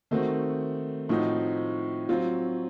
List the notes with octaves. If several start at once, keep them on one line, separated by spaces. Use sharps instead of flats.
D#3 A3 C4 F#4
A2 F3 C4 D#4 F#4
F#3 C4 F4